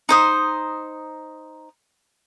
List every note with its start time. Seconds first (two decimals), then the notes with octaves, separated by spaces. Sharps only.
0.09 D#4 C5 D#6